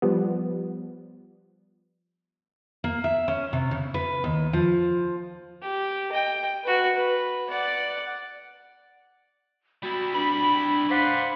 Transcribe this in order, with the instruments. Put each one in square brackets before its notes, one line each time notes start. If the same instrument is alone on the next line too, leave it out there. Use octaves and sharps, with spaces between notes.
[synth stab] F3 G3 B3
[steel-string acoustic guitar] A#3
E5
C#4
C3
C#3
B4
D#2
F3
[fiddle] G4
D#5 G5
F#4 B4
B4
D5 F#5
[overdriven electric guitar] G3 E4 [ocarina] F#4
[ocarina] D4 [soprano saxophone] B5
[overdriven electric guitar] B4 D5 [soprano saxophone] C5 [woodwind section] F5 F#5 B5